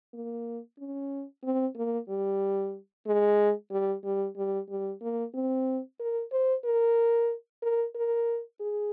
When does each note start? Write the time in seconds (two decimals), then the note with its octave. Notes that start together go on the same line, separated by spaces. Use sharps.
0.14 A#3
0.79 C#4
1.44 C4
1.76 A#3
2.09 G3
3.07 G#3
3.71 G3
4.04 G3
4.37 G3
4.69 G3
5.01 A#3
5.34 C4
6.00 A#4
6.32 C5
6.65 A#4
7.62 A#4
7.95 A#4
8.60 G#4